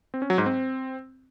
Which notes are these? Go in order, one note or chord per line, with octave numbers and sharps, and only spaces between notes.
C4
C#4
F#3
G#2
C4